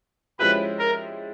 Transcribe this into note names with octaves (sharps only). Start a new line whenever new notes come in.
F3 G#3 C#4 E4 G4 B4
A#4